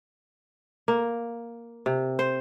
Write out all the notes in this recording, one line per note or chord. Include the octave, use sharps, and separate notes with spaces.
A#3
C3
C5